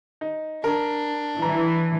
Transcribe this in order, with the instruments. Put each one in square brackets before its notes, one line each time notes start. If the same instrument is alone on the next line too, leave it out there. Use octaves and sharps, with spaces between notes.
[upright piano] D#4
[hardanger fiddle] D4 [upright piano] A#4
[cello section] E3 [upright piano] A#5